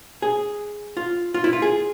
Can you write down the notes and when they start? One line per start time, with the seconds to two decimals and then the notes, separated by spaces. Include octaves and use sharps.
0.22 G#4
0.97 F4
1.34 F4
1.44 E4
1.53 F4
1.62 G#4